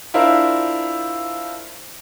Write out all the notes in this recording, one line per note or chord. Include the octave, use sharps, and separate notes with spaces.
D4 E4 F4 A#4 C5